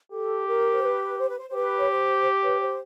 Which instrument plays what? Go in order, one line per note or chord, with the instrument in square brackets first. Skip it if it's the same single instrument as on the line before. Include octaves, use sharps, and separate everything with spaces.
[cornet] G4 [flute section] A4
[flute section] A#4
C5
B4
C5
B4
C5
C5
[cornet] G4 [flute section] B4
[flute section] C#5
C5
B4 C#5
C5